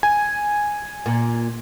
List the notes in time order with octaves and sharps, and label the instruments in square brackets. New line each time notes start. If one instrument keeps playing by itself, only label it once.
[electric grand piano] G#5
[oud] A#2